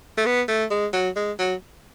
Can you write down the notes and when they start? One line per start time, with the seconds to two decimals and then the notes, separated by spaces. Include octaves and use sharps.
0.18 A3
0.26 B3
0.48 A3
0.71 G#3
0.93 F#3
1.16 G#3
1.39 F#3